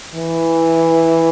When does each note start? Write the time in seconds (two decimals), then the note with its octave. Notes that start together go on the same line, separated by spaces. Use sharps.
0.15 E3